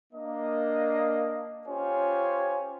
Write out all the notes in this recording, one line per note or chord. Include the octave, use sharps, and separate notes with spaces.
A#3 D4 D#5
C#4 F4 G4 C5 C#5 G#5